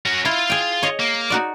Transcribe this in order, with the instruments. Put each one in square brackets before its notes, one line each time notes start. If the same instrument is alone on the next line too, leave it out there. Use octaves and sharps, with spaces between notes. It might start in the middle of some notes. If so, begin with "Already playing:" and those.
[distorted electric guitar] C#4 F#4
[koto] E4 [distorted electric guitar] F4 F5
[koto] G#4 G5
C#5 D#5
[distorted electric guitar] A#3
[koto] D#4 F#4 D5